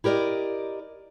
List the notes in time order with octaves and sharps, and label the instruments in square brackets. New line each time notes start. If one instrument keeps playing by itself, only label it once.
[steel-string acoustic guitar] E4 G4 A#4 D5 D#5